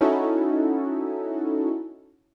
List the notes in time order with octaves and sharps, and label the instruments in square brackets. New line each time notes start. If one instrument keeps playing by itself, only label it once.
[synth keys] C#4 D#4 E4 F#4 A4